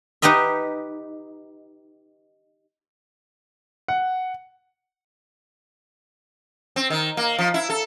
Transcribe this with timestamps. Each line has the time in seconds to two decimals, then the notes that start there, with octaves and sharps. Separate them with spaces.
0.22 D#4 G4 B4 D#5 E5
3.88 F#5
6.76 C4
6.90 D#3
7.17 A#3
7.38 F3
7.54 E4
7.70 A4